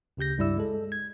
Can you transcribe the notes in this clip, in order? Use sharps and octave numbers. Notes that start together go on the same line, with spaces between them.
D2 C#3 G4 G6 A#6
C#2 G2 G3 E4 D5 E6
G#3 A4
G#6